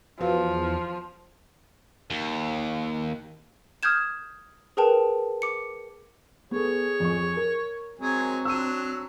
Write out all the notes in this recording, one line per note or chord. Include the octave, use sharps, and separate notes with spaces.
E2 F3 F#4 B4 F5
D#2
D#6 F6 G6 G#6 E7
G#4 A#4 B4 G5 A5
D6 C#7
B3 G#4 A4 C#5
F2 C#6
A#4
F#3 G#3 C4 G#4
F#3 D4 E6 D#7